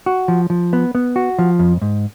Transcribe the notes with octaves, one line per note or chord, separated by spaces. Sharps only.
F#4
F3
F3
B3
B3
F#4
F3
F2
G#2